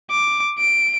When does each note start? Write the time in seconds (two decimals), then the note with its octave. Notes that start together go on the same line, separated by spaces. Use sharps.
0.11 D6
0.58 D7